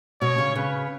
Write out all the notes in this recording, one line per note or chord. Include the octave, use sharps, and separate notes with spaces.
B2 C#5
C#3
C#3 B4